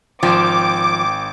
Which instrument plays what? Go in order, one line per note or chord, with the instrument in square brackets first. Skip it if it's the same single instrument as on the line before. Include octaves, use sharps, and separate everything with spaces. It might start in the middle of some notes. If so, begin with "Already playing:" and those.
[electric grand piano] G#1 G5 [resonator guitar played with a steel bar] F3 [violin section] D6